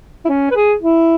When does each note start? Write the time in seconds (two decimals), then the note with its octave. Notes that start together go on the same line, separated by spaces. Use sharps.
0.25 E4
0.29 C#4
0.51 B4
0.55 G#4
0.82 E4